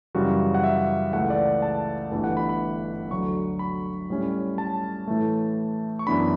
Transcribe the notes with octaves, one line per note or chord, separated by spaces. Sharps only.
F#2 C#3 E3 G3 F#4
F#5
E5
C#2 C#3 E3 A3 F#5
D5
A5
G1 G2 E3 A3
F#5
B5
B5
D2 D3 F#3 C#6
B5
A2 G3 C#4
A5
A2 E3 A3
C#6
F#2 E3 B3 D4 B5